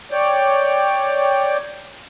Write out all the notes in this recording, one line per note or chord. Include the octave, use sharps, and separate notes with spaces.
C#5 D5 G5